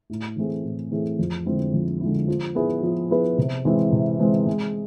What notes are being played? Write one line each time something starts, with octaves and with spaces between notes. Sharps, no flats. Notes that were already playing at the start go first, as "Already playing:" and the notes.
A2
E3 A3 C4 G#4
A2
E3 A3 C4 G#4
F2
D3 G#3 C4 E4
F2
D3 G#3 C4 E4
F3
B3 E4 G#4 B4
F3
B3 E4 G#4 B4
C3
E3 G#3 C4 E4
C3
E3 G#3 C4 E4
G#3